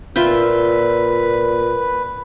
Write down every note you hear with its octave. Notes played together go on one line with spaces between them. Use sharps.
A#2 F4 B4 E5 G5